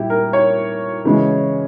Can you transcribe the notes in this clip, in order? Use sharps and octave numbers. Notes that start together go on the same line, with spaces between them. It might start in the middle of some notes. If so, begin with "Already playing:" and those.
Already playing: A#2 G3 E4 G4
A#4
C#5
C#3 E3 G#3